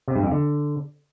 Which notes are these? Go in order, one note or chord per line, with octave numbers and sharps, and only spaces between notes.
C3
G2
F2
D3